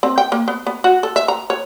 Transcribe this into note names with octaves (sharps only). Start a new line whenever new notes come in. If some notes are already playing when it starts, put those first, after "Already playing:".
C4
G5
A#3
B3
B3
F#4
A4
E5
A#5
C#5